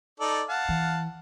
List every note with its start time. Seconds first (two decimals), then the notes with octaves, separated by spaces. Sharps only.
0.20 D#4 A4 D5
0.49 F5 F#5 A5
0.69 E3